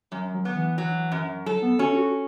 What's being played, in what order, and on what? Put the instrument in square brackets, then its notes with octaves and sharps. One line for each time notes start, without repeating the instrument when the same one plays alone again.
[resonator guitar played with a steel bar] F#2 [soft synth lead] F#3
[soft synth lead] F#3
[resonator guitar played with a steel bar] B3
[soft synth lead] E3
[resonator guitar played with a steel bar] F#3
F#2
[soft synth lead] F#3 [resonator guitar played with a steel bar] A4
[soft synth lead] B3
[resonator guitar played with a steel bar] C#4 [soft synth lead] F#4
[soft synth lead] F#4